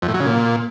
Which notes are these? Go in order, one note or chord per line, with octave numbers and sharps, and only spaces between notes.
F2
A2
F#3
C#3
A#2